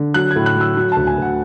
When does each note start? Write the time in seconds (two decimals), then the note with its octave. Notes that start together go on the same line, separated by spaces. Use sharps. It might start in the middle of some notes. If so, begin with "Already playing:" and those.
Already playing: D3
0.14 F#3 F#6
0.31 G#6
0.36 A2
0.46 F#6
0.57 F#3 E6
0.77 F#3
0.92 D2 A5
1.07 G#5
1.18 D2 F#5